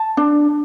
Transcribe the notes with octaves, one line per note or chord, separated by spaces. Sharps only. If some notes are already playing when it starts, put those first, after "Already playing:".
Already playing: A5
D4